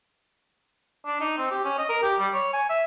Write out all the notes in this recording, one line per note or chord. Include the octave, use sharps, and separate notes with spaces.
D4
D#4
C4
G4
C#4
D#5
A#4
G4
G3
C#5
G#5
E5